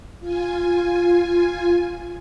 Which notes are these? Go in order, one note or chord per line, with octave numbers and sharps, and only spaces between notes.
F4 G#5